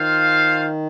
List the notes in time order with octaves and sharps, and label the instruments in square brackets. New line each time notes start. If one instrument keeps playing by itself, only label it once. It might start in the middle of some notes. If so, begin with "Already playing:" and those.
Already playing: [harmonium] D#3 [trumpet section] F4 C5 F5